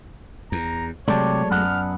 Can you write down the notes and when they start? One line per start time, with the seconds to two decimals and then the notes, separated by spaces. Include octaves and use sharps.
0.52 E2 A#5
1.08 C3 F#3 G#3 A3 G4 C#5 D5 A5
1.51 F#2 B3 F#5 F6